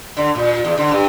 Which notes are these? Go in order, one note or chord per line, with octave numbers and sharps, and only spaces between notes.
D3
A#2
E2
D3
G2